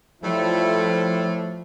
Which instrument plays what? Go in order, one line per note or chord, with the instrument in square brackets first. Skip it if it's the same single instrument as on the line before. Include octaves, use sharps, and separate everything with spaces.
[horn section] A2 G3 A3 [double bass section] F3